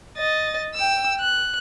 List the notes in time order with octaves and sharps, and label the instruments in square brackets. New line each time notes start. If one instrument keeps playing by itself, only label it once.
[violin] D#5 A6
G5 E6
F#6